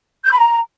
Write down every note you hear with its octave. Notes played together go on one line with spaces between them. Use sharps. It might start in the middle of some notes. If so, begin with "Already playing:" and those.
G6
B5
A#5